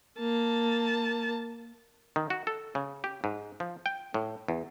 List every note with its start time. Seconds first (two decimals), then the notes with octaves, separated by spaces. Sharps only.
0.18 A#3 A5
2.16 D#3
2.30 F#4
2.47 A4
2.75 C#3
3.04 G4
3.24 G#2
3.60 F3
3.86 G5
4.14 A2
4.48 E2